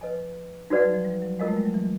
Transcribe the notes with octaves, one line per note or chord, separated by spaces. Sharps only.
F3 B4 D#5 G#5
G3 D#4 F#4 B4 D5 F#5
F#3
F3
G3
F#3
G#3 F4 A#4 D#5 F#5
A3
G3
F#3
E3